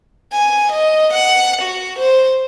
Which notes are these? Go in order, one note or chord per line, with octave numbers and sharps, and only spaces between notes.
G#5
D#5
F#5
F#4
C5